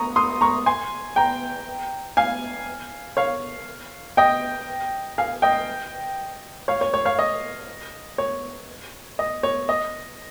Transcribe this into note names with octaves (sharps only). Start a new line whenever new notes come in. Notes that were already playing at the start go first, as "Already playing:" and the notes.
Already playing: A#5 C#6 D#6
C6 D#6
A#5 C#6
G#5 C6
G5 A#5
F5 G#5
C#5 F5
D#5 G5
F5 G#5
D#5 G5
C#5 F5
C#5
C#5
C#5 F5
D#5
C#5
D#5
C#5
D#5